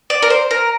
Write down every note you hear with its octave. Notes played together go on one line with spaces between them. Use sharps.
D5
A#4
C5
A#4